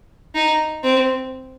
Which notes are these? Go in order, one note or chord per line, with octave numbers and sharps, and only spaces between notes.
D#4
C4